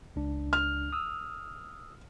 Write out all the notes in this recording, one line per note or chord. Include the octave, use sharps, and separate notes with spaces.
C#2 D4
F6
D#6 E6